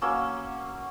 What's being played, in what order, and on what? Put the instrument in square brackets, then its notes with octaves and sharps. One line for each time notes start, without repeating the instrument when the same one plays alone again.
[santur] F#3 A#3 C#4 E6